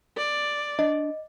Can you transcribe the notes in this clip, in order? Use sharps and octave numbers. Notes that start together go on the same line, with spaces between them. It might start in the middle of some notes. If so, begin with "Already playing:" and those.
D5
D4 D#5